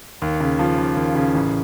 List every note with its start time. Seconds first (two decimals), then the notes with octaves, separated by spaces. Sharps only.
0.22 D#2
0.41 C#3
0.59 F3
0.78 D#2
0.97 D#2
1.15 C#3
1.35 A1